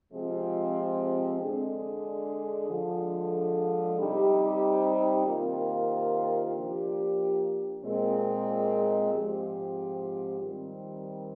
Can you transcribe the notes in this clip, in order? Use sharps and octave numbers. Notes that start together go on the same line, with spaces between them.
C3 F3 G#3 C4 F4
D3 G#3 D4 G#4
D3 F3 G#3
C3 G3 C4 D#4 G4
C3 D#3 A#3 F4
F3 A#3 D4 G4
A#2 G#3 C4
G#2 F3 C4 G4
D#3 G3 C4